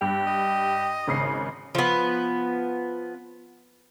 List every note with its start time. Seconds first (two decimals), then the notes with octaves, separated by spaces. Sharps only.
0.01 G2 G4
0.27 D#5
1.07 G#1 C#3 C7
1.75 F3 B3